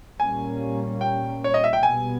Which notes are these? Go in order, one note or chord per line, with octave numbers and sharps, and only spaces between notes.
A#2 G3 A#3 C#4 G#5
G5
C#5
D#5
E5
G5
B2 G3 B3 G#5